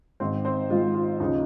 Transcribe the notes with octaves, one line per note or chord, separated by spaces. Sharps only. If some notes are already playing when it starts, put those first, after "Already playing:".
G#1 G#2 D#3 C4 C5
C4 C5
G#1 G#2 D#3 F4
F4
D#2 C#3 F3 D#4